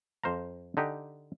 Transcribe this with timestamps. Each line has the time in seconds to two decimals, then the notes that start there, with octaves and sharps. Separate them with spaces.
0.23 F2 C5 F5 A#5
0.77 D3 D#4 G4